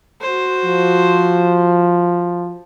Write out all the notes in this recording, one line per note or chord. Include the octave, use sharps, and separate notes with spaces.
F#4 C5
F3